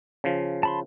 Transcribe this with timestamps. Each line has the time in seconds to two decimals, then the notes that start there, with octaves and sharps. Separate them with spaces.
0.24 C#3 F3
0.63 A5 B5 C6